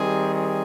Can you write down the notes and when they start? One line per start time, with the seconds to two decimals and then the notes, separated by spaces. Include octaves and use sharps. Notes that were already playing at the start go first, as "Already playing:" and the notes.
Already playing: D#3 G3 C4 G#4
0.34 G#4